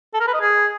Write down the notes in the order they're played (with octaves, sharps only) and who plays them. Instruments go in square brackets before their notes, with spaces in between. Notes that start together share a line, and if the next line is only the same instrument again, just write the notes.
[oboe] A4
A#4
B4
D#5
G#4